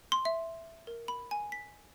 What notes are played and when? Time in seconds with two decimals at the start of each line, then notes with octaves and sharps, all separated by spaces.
0.12 C6
0.25 E5
0.87 A#4
1.08 B5
1.31 G#5
1.52 B6